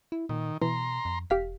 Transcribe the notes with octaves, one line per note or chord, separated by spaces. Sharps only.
E4
A#2 D#3
B2 E3 A#5 C6
F2
E1 G4 F5 B6